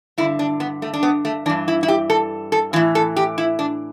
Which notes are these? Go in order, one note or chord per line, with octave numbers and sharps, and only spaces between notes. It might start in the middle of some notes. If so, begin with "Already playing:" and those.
G2 D3 E4
D4
B3
A3
D4
B3
A3
G2 E3 D4
E4
E4
G4
A4
A4
A2 E3 E4
A4
G4
E4
D4